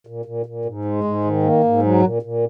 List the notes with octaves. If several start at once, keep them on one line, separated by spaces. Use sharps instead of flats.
A#2
A#2
A#2
G#2
G#3
G#2
D#3
A#3
G#2
F#3
A#2
A#2